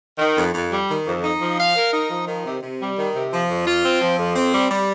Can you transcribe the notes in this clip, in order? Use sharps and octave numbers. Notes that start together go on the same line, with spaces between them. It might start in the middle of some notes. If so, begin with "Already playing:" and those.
D#3
F2
F2
G3
D#3
F2
D#4
F3
F5
A#4
D#4
F3
D#3
C3
C3
G3
D#3
C3
F3
F2
F4
C4
F3
F2
C4
G3
G3